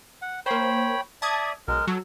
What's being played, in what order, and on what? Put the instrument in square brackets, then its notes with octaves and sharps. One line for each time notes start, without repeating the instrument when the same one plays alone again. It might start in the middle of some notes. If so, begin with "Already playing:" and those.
[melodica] F#5
[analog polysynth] A#3 C5 [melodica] C#5 G5 B5
[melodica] D5 E5 [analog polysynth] A5 D#6 G#6
[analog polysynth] B1 [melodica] G#3 A#4
[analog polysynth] F#3 [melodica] A4